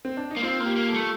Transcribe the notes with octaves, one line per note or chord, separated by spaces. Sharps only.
C4
D4
D#4
A#3
C4 F4
A#3 G4
A#3
A4
A3